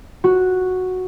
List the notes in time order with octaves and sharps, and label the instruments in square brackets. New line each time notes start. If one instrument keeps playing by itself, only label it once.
[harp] F#4